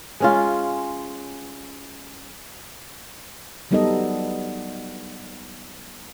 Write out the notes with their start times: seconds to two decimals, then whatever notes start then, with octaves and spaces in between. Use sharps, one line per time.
0.20 G#3 C#4 F4
3.71 F#3 G3 B3 D#4 A4 D#5